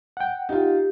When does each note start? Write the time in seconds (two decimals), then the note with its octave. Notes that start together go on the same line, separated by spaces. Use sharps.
0.17 F#5 G5
0.49 D#4 F4 G4